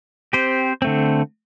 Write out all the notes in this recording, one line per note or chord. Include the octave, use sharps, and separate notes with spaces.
C4 G4 C5
D3 A3 C4